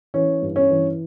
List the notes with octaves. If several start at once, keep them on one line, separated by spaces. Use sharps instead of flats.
E3 C#4
G2
C#4
E3